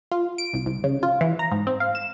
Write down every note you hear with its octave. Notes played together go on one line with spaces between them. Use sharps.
F4
D7
C2
C2
C#3
F4
E3
A#5
G#2
C4
F5
E7